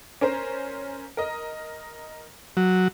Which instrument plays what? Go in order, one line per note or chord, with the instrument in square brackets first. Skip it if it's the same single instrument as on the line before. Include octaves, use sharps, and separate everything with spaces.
[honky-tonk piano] C#4 A#4 C5
A#4 D#5
[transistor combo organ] F#3